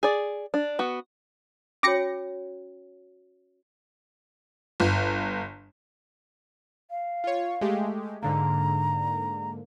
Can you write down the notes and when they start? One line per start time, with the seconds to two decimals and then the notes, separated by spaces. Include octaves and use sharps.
0.03 G#4 D5
0.54 D4
0.79 B3 F#4
1.83 C#4 F#4 C#5 D6 A#6 C#7
4.80 G1
6.90 F5
7.24 F4 C#5
7.61 G#3 A3 G4
8.23 G#2 D3 A#3 A#5